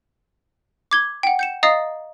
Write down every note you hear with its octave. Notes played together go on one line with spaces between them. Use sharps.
D6 G#6 G7
F#5 G5
G6 C#7 E7
D#5 F5 A#5 D#6 A6 C7